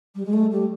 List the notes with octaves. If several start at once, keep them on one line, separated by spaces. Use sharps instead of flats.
G3
G#3
A3
G3